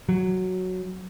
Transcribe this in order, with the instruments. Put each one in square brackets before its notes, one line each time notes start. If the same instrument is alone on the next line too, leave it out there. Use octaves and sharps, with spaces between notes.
[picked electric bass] F#3